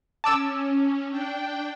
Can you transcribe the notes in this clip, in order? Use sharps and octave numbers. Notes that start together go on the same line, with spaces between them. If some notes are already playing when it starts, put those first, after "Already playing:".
C#4 A5 D6 E6
D4 G5